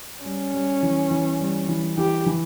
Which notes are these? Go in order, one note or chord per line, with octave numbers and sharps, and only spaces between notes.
G3 C#4
G3
E3
E3
G3
E3
E3 G4
E3